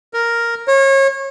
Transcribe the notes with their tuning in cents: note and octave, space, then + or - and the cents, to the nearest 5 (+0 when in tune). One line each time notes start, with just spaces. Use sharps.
A#4 +0
C#5 -30